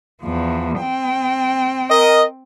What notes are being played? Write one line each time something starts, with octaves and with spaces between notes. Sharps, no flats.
E2 F3
C4 G5
A#4 D#5